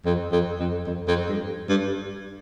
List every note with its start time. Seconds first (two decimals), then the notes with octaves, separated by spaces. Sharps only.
0.05 F2
0.31 F2
0.59 F2
0.87 F2
1.07 F2
1.29 G2
1.69 G2